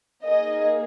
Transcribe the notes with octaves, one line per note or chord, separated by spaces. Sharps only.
A#3 D#4 G#4 D#5